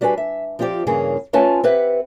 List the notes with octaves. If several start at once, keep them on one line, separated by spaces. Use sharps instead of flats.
G3 D4 F#4 B4 G#5
E5
F3 C4 F4 G4 D5
G2 C#3 E3 A#3 G#4
A3 C#4 F4 B4 G#5 A5
C4 G4 B4 E5 F#5